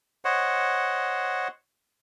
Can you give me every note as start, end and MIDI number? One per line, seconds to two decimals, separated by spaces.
0.25 1.48 72
0.25 1.48 73
0.25 1.48 75
0.25 1.48 78